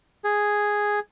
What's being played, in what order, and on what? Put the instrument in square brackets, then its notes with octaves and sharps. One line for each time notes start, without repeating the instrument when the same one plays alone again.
[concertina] G#4